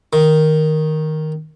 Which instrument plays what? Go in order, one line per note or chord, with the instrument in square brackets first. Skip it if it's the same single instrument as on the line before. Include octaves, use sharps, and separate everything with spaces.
[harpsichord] D#3